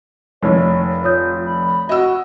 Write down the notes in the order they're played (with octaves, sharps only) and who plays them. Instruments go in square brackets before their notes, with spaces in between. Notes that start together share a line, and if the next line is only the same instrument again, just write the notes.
[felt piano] F1 D#3 [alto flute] C#5
[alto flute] F4 [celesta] C#5 D#6 G6
[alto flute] B5
[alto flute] F#4 [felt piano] D#5 E6